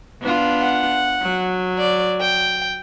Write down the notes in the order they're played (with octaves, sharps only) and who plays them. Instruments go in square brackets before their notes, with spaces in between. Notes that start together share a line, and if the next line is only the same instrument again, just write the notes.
[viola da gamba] B3 D4 F4
[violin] F#5
[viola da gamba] F#3
[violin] D5
G5